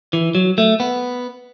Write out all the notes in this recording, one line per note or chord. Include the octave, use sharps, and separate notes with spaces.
E3
F#3
A3
B3